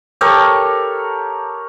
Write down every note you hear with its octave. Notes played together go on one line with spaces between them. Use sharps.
G4 A4 A#4 C#5